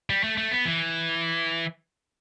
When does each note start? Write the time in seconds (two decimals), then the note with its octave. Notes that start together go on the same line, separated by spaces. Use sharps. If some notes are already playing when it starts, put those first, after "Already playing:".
0.10 G3
0.24 A3
0.37 A3
0.51 B3
0.66 E3